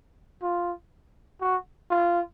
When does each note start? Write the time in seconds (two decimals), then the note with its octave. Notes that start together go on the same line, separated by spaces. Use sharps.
0.42 F4
1.41 F#4
1.91 F4